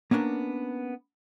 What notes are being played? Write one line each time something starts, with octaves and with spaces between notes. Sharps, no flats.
A#3 B3 C#4 D4 A#4